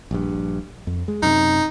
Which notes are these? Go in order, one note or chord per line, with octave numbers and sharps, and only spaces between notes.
A#1 G2
F2
G#3
F#2 C3 D#4